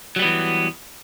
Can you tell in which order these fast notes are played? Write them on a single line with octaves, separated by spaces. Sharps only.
F#3 G3 B3 E3